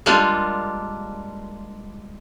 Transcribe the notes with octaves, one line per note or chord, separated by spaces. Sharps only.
G3 G#3 A#3 D4 F4 G4